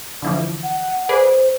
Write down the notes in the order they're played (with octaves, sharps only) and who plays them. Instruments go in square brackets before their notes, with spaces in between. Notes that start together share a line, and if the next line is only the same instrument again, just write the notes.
[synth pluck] D3 E3 F3
[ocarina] F#5
[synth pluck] G#4 B4 D5 [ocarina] C5